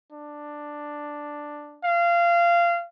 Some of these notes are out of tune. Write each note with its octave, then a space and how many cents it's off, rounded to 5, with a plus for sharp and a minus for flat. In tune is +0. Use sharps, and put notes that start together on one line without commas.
D4 +5
F5 -20